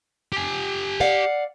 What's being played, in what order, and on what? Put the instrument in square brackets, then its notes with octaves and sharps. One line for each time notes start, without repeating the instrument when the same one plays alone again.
[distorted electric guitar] G4 G#5
[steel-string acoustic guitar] D5 F5 F#5